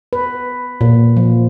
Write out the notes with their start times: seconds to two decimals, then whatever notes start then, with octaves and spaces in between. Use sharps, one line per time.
0.13 B4
0.81 A#2
1.17 F3